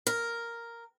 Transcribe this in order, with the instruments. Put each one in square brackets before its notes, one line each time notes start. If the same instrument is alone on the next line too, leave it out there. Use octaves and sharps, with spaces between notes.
[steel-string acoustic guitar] A#4